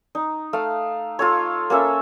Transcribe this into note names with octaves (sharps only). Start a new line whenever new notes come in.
D#4
A3 F5
F4 A4 C#5
A#3 C#4 A4 E5